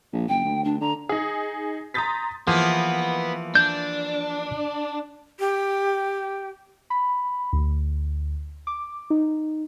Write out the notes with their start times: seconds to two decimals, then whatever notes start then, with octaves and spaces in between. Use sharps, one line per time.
0.13 A#1
0.29 F#1 G5
0.45 D2
0.64 D2 D4
0.81 D3 A#5
1.09 D#4 G#4
1.94 A#5 C6 D#6 G6 A6 B6
2.47 E3 F3 A#3 B3 G#4
3.55 D4 G6
5.40 G4
6.90 B5
7.53 D2
8.67 D6
9.10 D#4